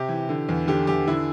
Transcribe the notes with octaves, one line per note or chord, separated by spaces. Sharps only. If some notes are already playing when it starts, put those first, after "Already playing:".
Already playing: C3 G4
E3
D3
E2
D3 G4
E2 G4
D3 E4